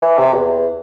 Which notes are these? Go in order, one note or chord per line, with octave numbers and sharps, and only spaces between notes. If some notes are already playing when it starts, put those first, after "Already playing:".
E3
C3
E2